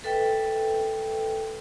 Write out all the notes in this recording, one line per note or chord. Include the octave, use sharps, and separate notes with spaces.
A4 B4 E5 G5